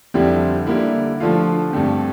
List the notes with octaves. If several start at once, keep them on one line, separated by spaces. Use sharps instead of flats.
F2 D3 G3 C4 E4
D3 G3 A#3 E4
D3 F3 A3 D4 F4
G2 D3 A3 C4